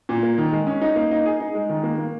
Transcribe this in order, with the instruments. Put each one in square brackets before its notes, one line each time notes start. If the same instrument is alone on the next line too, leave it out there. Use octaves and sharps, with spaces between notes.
[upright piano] A#2
A#3
D#3
G#3
C#4
D#4
A#3
D#4
G#4
D#4
G#3
D#3
A#3
A#3